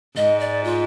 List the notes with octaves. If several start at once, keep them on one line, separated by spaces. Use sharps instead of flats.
G#2 D#5
D5
F4